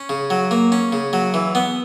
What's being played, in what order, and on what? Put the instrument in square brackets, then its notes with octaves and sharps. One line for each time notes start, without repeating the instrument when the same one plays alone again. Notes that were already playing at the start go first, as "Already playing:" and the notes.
Already playing: [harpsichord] C#4
C#3
F#3
A#3
C#4
C#3
F#3
E3
B3